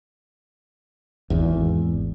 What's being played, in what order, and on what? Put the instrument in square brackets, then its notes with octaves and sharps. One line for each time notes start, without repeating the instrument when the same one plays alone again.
[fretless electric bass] G#1 E2